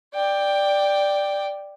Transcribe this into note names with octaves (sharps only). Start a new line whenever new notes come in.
D5 G5